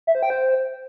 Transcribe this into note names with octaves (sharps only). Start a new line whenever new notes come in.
E5
C5
G5
C5